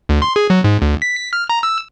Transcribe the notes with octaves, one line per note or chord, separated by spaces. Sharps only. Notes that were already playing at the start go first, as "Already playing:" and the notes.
D2
C6
G#4
F#3
G#2
D2
B6
F6
A#5
E6